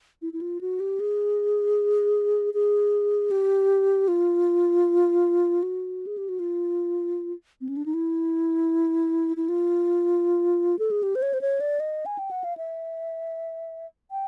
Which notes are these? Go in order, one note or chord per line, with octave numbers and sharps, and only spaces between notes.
E4
E4
F4
F#4
G4
G#4
G#4
G4
F4
F#4
G#4
G4
F#4
F4
C4
C#4
D4
D#4
E4
E4
F4
A4
G#4
G4
C5
C#5
C5
C#5
D5
D#5
G#5
G5
F#5
F5
E5
G5